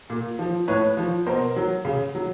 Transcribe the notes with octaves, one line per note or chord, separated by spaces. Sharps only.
A#2
F3
A2 B4 C#5
F3
B2 A#4 C5
F#3
C#3
F#3